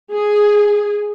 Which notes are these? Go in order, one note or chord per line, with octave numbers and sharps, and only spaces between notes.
G#4